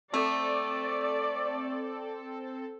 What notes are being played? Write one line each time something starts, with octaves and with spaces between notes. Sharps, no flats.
A3 C4 A4 D5